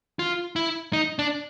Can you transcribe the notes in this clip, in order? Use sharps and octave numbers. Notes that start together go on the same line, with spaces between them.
F4
E4
D#4
D4